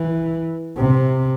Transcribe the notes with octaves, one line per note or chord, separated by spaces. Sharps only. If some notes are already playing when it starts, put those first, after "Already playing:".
Already playing: E3
C3